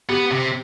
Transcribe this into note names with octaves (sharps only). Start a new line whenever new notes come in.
B3 G4
C3